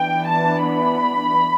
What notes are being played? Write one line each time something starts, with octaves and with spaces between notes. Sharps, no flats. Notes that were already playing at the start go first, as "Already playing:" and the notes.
Already playing: E3 B3 D4 G5
A5
B5